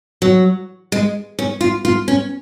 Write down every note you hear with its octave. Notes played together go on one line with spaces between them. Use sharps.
F#3
G#3
C#4
F4
F4
C#4